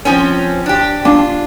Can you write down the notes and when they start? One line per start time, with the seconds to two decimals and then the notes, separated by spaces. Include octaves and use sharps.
0.05 F3 C4 C#4
0.66 D4 G4
1.05 D4 F4